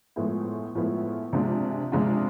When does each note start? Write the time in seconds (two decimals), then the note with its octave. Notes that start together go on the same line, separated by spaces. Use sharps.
0.16 A2 F3 G#3 B3 E4
0.75 A2 F3 G#3 B3 E4
1.33 C3 F3 G#3 D4 F4
1.92 C3 F3 G#3 D4 F4